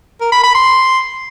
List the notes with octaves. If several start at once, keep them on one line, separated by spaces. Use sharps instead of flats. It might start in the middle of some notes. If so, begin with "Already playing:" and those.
A#4
B5
B5
C6